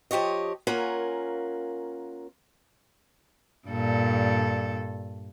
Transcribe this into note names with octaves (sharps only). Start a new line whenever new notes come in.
F3 G4 C#5 D#5
A#3 C#4 F4 A#4 F#5 G#5
G2 A#2 A4